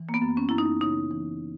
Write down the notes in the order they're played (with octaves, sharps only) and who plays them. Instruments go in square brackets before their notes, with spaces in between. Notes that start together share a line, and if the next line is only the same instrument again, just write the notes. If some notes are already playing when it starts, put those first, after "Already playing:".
Already playing: [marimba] E3
A#3
B3
F#2
C#4
F#2 E4
D#4
C#3 D#4
E3